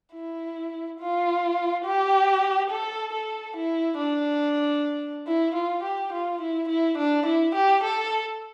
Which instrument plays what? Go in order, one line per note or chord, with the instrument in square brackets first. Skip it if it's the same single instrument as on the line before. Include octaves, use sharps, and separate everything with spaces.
[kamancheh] E4
F4
G4
A4
A4
E4
D4
E4
F4
G4
F4
E4
E4
D4
E4
G4
A4